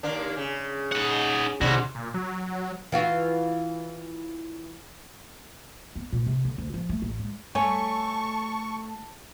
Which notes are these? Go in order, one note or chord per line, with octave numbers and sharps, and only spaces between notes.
D#2 A#3 D4
C#3
D#4 F#5
D#2 G#2 C3 D4 E4 F#4
A#2
F#3
E3 F4 F#4
B3
A#2
C3
D3
D2
F3
A3
A1
G#3
A3 C#5 G#5 A5 C#6